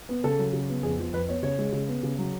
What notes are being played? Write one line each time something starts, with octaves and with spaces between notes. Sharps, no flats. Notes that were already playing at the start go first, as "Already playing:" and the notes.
B3
C#3 A4
F#3
C#3
B3
F2 G#4
F3
F2 B4
B3 C#5
C#3 C#5
G#3
C#3
B3
C#3
F#3